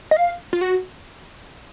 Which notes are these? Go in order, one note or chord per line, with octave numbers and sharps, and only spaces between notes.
D#5
F5
F4
F#4